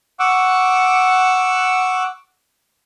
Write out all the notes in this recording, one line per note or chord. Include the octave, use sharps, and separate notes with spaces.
F#5 C#6 D6 E6